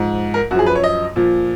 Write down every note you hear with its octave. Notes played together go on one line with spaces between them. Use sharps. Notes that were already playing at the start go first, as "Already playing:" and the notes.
Already playing: G#2 F3
A#4
F#2 F3 F#4 G#4
B4
C#5
D#5
A#2 F3